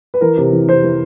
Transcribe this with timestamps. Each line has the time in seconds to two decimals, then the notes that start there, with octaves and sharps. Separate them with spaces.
0.14 B4
0.21 E3 A#4
0.37 C3
0.52 E3
0.69 C3 C5
0.84 E3